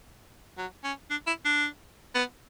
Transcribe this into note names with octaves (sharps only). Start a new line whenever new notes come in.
F#3
C#4
D4
E4
D4
B3